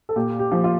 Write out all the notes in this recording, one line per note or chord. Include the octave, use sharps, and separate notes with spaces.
A4
A#2 G4
G4
F3
F4